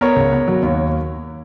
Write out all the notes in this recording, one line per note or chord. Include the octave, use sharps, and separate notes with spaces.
B3 A#4 C#5
C#2
B3
F#3
D#2